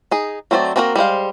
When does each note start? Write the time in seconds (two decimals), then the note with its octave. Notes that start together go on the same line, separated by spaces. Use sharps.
0.11 D#4 G#4
0.51 F#3 A3 C4 A4 D5
0.76 A#3 C4 D4 F#4 A#4
0.96 G3 G#3 C5 F5